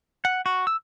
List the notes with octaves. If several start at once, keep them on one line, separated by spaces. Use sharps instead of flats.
F#5
F#4
E6